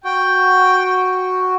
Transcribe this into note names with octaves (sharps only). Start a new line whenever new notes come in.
F#4 G5